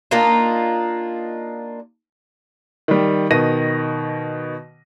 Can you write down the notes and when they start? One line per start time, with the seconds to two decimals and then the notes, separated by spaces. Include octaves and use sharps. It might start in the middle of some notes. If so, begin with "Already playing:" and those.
0.11 A#3 D4 D#4 F4
2.88 D#3 G3
3.31 B2 D#3 A#6 D#7